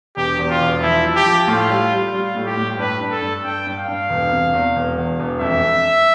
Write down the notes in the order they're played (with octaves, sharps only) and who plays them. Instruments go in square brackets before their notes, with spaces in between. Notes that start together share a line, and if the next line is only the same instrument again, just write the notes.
[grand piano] E1 [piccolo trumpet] G4
[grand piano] E2
[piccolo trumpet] F4
[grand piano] E1
[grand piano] F3 [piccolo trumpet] E4
[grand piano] F3
[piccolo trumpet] G4
[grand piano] F3
[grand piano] A2 [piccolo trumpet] F4
[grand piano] G3
G3
[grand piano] G3 [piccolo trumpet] F4
[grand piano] A2
[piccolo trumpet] G4
[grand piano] A2
[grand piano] G2 [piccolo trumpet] B4
[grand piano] G2
[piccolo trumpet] A4
[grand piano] G2
[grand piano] G2 [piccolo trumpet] G5
[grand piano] G2
[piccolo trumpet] F5
[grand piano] G2
E1
C3
E2
E1
E2
E1
[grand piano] F2 [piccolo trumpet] E5